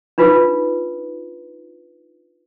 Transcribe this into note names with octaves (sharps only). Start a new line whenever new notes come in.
D4 D#4 F4 B4